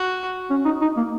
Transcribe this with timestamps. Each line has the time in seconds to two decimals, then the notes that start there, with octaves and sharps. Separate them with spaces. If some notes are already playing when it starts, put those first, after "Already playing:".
Already playing: F#4
0.50 C#4
0.65 D#4
0.81 D#4
0.97 A#3